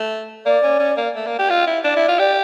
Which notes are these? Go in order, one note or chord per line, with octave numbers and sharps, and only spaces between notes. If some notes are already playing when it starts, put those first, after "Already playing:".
Already playing: A3
A#3 D5
C#4
C#4
A#3
A3
A#3
G4
F4
E4
D4 D5
E4
F4
G4 D5